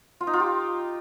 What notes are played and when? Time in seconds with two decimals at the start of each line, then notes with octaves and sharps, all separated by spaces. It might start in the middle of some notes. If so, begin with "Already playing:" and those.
0.21 F4
0.27 D#4
0.33 F4
0.40 G4